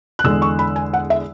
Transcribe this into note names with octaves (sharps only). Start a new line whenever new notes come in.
F#6
E2 D3 G#3 E6
C#6
B5
G#5
F#5
E5